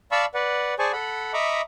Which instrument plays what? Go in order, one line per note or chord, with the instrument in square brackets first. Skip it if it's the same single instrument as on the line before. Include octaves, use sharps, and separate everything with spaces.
[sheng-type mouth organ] D5 F5 A5 B5 C#6 E6
B4 D5 F#5
G#4 C5 D5 G#5 A5 C#6
A4 F#5 B5
D#5 E5 A#5 B5 C#6 D6